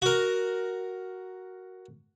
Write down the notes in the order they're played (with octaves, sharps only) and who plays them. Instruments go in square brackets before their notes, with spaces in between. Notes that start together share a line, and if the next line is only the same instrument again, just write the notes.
[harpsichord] F#4 A#4